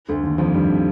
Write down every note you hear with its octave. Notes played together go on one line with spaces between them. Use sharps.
D2 D3
D#2 D#3
F2 F3
G2 G3